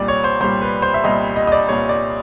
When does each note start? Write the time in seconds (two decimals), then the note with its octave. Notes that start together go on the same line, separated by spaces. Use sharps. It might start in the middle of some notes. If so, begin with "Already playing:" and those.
Already playing: C2 A#2 G3 D5
0.08 C#5
0.24 C5
0.40 C2 A#2 G3 C5
0.62 B4
0.82 C5
0.94 E5
1.04 C2 A#2 G3 D#5
1.36 D#5
1.47 D#5
1.52 D5
1.69 C2 A#2 G3 C#5
1.89 D5